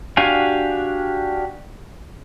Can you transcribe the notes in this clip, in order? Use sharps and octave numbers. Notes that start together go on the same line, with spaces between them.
D4 F#4 G4 F5 G#5